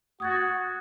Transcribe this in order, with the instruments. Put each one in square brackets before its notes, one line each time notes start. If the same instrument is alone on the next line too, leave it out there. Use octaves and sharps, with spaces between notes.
[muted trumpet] F#4 [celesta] D#6 G#6 A6